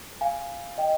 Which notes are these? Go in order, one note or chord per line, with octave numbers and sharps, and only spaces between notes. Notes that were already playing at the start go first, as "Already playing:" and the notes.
F5 G#5
D#5 G5